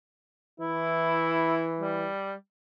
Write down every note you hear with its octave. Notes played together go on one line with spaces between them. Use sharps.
E3 E4
G3